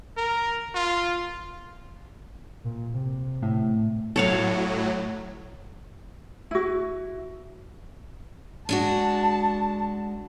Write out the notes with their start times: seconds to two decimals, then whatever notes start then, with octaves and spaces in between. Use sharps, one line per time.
0.17 A#4
0.75 F4
2.64 A#2
2.94 C3
3.42 A2
4.16 A2 F#3 A4 C#5 F5
6.51 E4 F#4
8.69 G#3 D4 F#4 A5